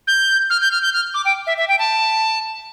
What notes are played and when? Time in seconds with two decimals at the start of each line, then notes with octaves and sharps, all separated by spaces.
0.07 G6
0.50 F6
0.61 G6
0.71 F6
0.82 G6
0.93 F6
1.14 D6
1.25 G5
1.47 E5
1.57 E5
1.68 G5
1.79 A5